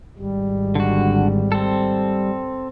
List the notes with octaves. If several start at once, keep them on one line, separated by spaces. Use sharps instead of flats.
G#1 G3
D3 F#4
C4 A4